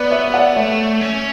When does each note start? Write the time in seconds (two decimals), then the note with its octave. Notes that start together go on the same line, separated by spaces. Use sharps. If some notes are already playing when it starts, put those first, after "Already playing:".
Already playing: B3 B4 D5
0.11 C#5 E5
0.34 D5 F#5
0.56 A3 C#5 E5
1.01 C#4